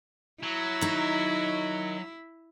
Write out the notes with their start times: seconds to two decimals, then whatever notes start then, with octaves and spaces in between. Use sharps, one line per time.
0.43 F#3 E4
0.81 D#3 D#4